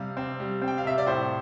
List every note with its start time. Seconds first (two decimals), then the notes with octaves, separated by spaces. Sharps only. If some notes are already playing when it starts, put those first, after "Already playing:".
Already playing: C3 G3 F5
0.17 C4
0.40 G3
0.62 C4
0.68 G5
0.78 F5
0.85 C3 E5
0.98 D5
1.07 A2 C5